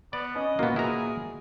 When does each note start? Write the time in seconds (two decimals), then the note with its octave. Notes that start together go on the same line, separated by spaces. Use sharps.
0.13 B3 D5
0.35 C#4 D#5
0.59 A#2 A#3 B3 F#4
0.76 E4 G#4 A#5